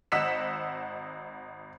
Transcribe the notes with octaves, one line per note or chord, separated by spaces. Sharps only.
G#1 D#5 F#5 E6 B6 E7